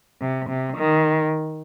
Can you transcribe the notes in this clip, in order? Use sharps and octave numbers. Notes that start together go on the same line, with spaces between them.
C3
C3
D#3